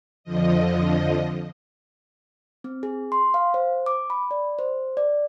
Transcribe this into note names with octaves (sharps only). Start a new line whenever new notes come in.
F2 D3 F3 D#5
C4
G#4
C6
F5
C5
D6
B5
D5
C5
D5